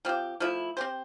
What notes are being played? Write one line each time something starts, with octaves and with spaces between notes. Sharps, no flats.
F3 C4 G4
F3 A3 E4
C4 G4 C5